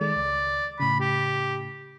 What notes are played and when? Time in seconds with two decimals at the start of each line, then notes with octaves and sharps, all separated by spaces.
0.01 D#3 G#3 A4 D5
0.16 C#2
0.80 A2 C#3 B5
1.00 G4